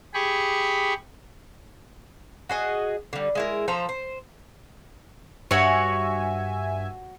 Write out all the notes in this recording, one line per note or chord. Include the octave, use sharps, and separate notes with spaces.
G4 G#4 B5 C#6
F#4 G#4 D#5
D3 G3
G#3 E4 A#4
F3 A4 C5 A#5
C5
G2 F#4 C#5 E5 G#5